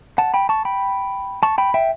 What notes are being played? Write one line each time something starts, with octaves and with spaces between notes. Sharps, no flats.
F#5 A5
G5 B5
A5 C#6
G5 B5
A5 C#6
G5 B5
E5 G5